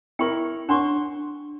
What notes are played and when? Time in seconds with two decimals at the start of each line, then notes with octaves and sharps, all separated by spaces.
0.19 E4 A#4 G5 C#6
0.69 D4 F#5 C6 C#6